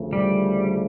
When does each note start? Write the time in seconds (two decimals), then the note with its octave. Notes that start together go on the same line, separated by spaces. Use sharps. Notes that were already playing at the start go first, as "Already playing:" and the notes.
Already playing: D2 C#3 F3 A3
0.13 G3